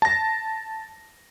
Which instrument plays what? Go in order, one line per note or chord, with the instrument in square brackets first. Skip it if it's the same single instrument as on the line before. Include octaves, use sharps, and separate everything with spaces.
[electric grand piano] A5 A#6